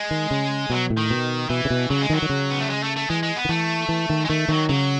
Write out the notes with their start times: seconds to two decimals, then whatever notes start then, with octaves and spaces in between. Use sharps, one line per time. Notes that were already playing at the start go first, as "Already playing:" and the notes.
Already playing: G#3
0.11 D#3
0.31 C#3
0.70 B2 F#3
0.90 A2
0.97 D#3
1.10 B2
1.50 B2 E3
1.65 C#3
1.70 B2
1.90 C#3 F#3
2.01 G#3
2.10 D#3 F#3
2.22 D#3
2.30 C#3
2.50 B3
2.60 A3
2.70 G#3
2.83 A3
2.96 A3
3.10 E3 G#3
3.23 G#3
3.36 B3
3.45 D#3
3.49 E3 A3
3.89 E3
4.10 D#3
4.25 G#3
4.30 D#3 A3
4.49 D#3 F#3
4.69 C#3 F#3